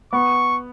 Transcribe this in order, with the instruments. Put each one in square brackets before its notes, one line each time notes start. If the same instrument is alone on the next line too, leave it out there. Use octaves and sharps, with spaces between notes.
[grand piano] B3 [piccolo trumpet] C#6